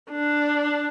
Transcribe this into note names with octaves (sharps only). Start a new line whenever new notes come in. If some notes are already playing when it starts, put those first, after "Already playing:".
D4